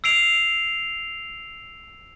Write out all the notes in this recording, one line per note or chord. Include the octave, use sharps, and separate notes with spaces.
E6 C7 D7 F7